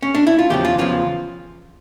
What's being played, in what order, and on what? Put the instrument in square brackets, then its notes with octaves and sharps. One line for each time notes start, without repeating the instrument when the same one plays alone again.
[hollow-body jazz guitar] C#4
D4
E4
F4
E2 C#3 F3 G4
F4
E2 C#3 F3 F4